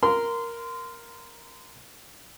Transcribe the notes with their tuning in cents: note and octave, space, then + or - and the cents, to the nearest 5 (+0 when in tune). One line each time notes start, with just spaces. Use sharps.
A#4 +0 C6 -25